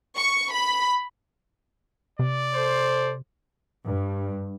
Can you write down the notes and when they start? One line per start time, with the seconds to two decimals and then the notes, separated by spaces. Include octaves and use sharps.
0.17 C#6
0.53 B5
2.19 C3 D5
2.54 A4 C5
3.86 G2